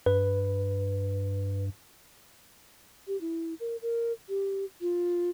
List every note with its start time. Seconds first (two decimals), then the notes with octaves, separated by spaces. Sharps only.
0.06 G2 B4
3.07 G4
3.21 E4
3.60 A#4
3.82 A#4
4.29 G4
4.81 F4